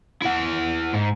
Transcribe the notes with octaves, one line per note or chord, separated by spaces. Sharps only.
E4 F#5
G#2